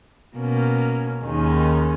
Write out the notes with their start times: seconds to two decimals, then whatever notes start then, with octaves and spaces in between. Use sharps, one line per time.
0.36 B2 A#3 C#4
1.25 D#2 D#3 G#3 C#4